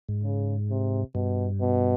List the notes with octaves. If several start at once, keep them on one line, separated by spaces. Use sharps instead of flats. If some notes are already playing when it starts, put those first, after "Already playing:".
G#2
C#3
C3
G2 B2
B2